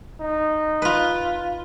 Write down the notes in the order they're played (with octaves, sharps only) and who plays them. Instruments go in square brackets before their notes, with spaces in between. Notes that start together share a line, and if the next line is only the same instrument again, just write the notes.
[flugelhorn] D#4
[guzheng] F4 B4